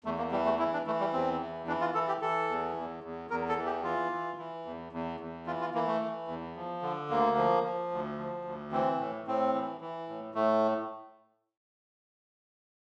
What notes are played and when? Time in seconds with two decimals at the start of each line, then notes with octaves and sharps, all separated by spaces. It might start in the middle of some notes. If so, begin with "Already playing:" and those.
0.04 E2 A3
0.18 A#3
0.31 E3 G3
0.45 A3
0.59 E3 E4
0.73 D4
0.86 E3 A3
1.00 G3
1.13 E2 C4
1.41 E3
1.67 E3 D4
1.81 F4
1.94 E3 A4
2.08 G4
2.21 E3 A4
2.49 E2
2.77 E2
3.04 E2
3.30 E2 A#4
3.49 A4
3.58 E3
3.66 G4
3.84 E3 F4
4.12 E3
4.38 E3
4.66 E2
4.93 E2
5.20 E2
5.47 E3 F4
5.61 F4
5.74 E3 A#3
5.87 A3
6.01 E3
6.28 E2
6.56 F3
6.82 D3
7.10 D2 A#3
7.37 F3
7.64 F3
7.92 D2
8.18 F3
8.45 D2
8.72 E3 C4
8.99 A2
9.27 A2 C4
9.54 E3
9.81 E3
10.09 A2
10.34 A2 A3